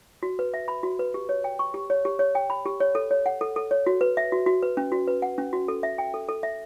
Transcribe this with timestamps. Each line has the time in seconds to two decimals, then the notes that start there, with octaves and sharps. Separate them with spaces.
0.23 F#4
0.39 B4
0.54 E5
0.68 B5
0.83 F#4
0.99 B4
1.14 G4
1.29 C#5
1.44 G5
1.59 C#6
1.74 G4
1.90 C#5
2.05 G4
2.19 C#5
2.35 G5
2.50 B5
2.66 G4
2.80 C#5
2.95 A4
3.11 C#5
3.26 F#5
3.41 A4
3.56 A4
3.71 C#5
3.86 F#4
4.01 B4
4.17 E5
4.32 F#4
4.46 F#4
4.62 B4
4.77 C#4
4.92 F#4
5.08 B4
5.22 F#5
5.38 C#4
5.53 F#4
5.68 A4
5.83 E5
5.98 G5
6.14 A4
6.29 A4
6.43 E5